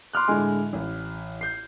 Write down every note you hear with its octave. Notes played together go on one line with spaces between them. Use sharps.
C6 D6 F6 F#6
A2 D3 G#3 G#5
A1
G6 C7